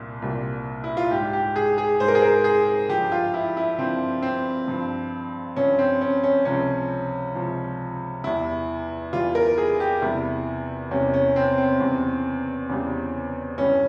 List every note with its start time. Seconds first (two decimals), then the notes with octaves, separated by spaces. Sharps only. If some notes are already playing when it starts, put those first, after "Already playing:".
Already playing: C2 A#2
0.22 C2 A#2 G3
0.84 E4
0.97 F4
1.11 G#2 G3 G4
1.33 G4
1.56 G#4
1.78 G#4
2.00 G#2 G3 C5
2.08 A#4
2.15 G#4
2.22 A#4
2.44 G#4
2.89 G2 F3 G4
3.12 F4
3.34 E4
3.57 E4
3.79 G2 F3 C4
4.22 C4
4.68 G2 F3
5.56 G2 F3 C#4
5.79 C4
6.01 C#4
6.24 C#4
6.45 C#2 C3 F3 C#4
7.35 C#2 C3 F3
8.24 E2 E3 G3 E4
9.13 E2 E3 G3 F4
9.35 A#4
9.58 G#4
9.80 G4
10.02 E2 C3 G3 E4
10.91 E2 C3 G3 C#4
11.14 C#4
11.36 C4
11.58 C4
11.80 E2 C#3 G3
12.69 E2 C#3 G3
13.58 G2 E3 G3 C#4